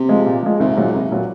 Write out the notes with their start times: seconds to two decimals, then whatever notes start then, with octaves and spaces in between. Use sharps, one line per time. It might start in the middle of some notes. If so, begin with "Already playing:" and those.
Already playing: C3
0.09 F3 G#3
0.26 A#2
0.43 F3 G#3
0.60 C2 G#2
0.77 A#2 F#3
0.94 C2
1.11 A#2 F#3